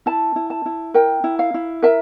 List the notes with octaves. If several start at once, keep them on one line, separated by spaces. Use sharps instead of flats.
E4 A5
E4
A5
E4
A#4 G5
E4
F5
E4
A#4 E5